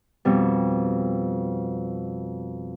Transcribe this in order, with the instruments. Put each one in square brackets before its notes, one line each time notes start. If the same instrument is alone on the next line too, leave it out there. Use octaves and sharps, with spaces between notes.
[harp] F2 B2 G3